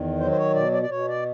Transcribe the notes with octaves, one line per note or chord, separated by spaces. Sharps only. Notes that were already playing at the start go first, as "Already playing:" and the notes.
Already playing: E2 D#3
F#3 C5
C5
C#5
B2 D5
D5
D5
B2 C#5
D5